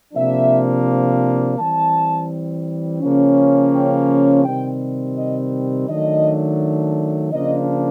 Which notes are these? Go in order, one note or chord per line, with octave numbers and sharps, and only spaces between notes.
C3 F3 A#3 D4 E5
E3 G3 C4 A5
C#3 F3 A#3 C#4
G5
C3 D#3 G3 C4 G5
D#5
D#3 F#3 A3 D4 D#5
C#3 F3 A#3 D4 D#5